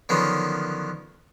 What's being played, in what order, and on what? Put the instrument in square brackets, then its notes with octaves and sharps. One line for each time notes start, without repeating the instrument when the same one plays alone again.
[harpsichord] D3 D#3 F3 F#3 B3 C#4